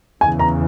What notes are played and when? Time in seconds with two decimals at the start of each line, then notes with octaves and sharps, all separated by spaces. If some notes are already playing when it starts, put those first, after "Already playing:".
0.21 E2 C#3 E3 G#5
0.39 A#5